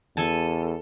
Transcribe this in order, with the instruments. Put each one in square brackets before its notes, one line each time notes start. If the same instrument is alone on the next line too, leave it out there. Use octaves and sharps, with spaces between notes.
[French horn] E2 [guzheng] A4 G#5 A5